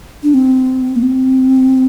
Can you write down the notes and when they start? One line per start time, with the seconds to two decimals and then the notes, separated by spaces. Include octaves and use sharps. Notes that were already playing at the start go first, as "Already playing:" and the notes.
0.23 D4
0.34 C4
0.96 A#3
1.03 C4